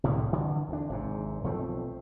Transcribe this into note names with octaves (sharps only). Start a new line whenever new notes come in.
C2 A2 D3 G3
D3 E3
D2 D4
G#1 G#2 C3
B1 F3 A3 C4